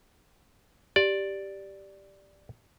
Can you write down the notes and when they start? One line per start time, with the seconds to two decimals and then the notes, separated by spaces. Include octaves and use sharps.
0.96 G4 D5